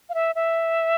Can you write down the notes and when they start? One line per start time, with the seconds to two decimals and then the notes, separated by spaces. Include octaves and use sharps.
0.09 F5
0.14 E5
0.35 E5